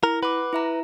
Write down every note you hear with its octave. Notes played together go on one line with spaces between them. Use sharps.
E4 A#4
B4 F#5 D6
E4 E5 A#5